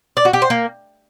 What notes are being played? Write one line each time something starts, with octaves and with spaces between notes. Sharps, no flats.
D5
F#4
G4
C5
A#3